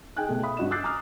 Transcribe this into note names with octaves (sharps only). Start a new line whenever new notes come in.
D#4 G#4 G5 G#5 F#6
B2 A3
E5 F5 B5 D#6
G2 C#4 F#4 D#5 E7
D6 E6 F#6 G6 A6 C7
G#5 A#5 D6 D#6 F6